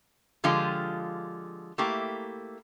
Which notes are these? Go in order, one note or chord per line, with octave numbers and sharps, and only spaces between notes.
D3 F3 G#3 F4 G4
A3 A#3 E4 G4